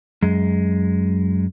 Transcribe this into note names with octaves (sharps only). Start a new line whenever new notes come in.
F#2 G#3